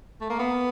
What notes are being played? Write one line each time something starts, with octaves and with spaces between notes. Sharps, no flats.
A3
A#3
B3